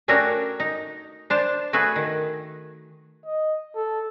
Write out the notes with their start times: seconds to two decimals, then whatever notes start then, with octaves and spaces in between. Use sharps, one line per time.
0.08 A3 C#4 D4 F#4 G4 A#4
0.60 D#4
1.30 D4 C5 A5
1.73 A3 F#4 G#4 B4
1.96 D#3
3.26 D#5
3.75 A4